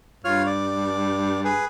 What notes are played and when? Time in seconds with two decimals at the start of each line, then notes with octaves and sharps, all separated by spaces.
0.25 G2 F4 C#5 F6
0.46 D5
1.45 G#4 B4